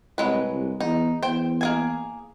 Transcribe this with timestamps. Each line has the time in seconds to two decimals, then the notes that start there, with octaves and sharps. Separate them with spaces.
0.18 C2 F#3 G#3 B4
0.49 C2
0.80 E2 D#4
1.23 E2 C5 G5
1.61 A#3 G#4 G#5